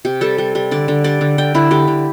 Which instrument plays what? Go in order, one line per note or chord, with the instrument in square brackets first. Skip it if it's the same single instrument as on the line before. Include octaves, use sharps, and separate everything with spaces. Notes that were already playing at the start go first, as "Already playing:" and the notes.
[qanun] C3 G4
G3 A4
G3
G3
D3 D5
D3
G3 D5
D3
D3 G5
D3 E4
D3 G4
D3